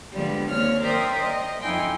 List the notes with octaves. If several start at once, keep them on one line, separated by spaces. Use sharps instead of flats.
D3 F3 G3 G#3 B3
D#2 C4 C#5 F6
A#4 C5 D5 E5 G5 D#6
D#5
F2 D#4 E4 G5 G#5 C6